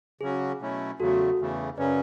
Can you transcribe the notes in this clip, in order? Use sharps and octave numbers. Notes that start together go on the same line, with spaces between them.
C#3 F#3 C#4 F#4 G#4
B2 F#3 A3 C#4 E4
E2 C#3 F#3 A3 F#4 A4
E2 C#3 E3 A3
F#2 C#3 F#3 C#4 B4 D5